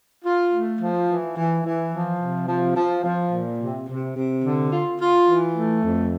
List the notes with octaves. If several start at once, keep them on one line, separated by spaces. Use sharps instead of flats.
F4
A3
F3
E3
E3
E3
F3
C3
F3
F3
F3
A#2
C3
C3
C3
D3
F4
F4
E3
A3
F2